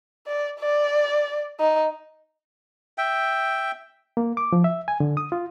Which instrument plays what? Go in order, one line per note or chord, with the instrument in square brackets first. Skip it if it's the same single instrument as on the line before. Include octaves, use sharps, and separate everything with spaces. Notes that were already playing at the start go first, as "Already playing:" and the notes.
[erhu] D5
D5
D#4
[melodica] E5 G5
[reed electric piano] A#3
D6
F3
E5
G#5
D3
D#6
F4